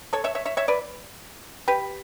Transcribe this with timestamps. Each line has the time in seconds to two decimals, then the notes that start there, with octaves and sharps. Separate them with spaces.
0.13 A4 C#5
0.24 C#5 E5
0.35 C#5 E5
0.45 C#5 E5
0.57 C#5 E5
0.68 B4 D5
1.68 G4 B4